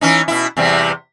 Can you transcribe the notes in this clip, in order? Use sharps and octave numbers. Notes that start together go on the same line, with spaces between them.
E3 C#4 D#4
B2 E4
E2 C3 G3